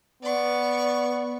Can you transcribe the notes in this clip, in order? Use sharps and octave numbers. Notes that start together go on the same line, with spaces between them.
B3 D5 C#6